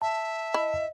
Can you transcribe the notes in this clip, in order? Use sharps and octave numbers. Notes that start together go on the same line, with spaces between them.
E5 A5
E4 D#5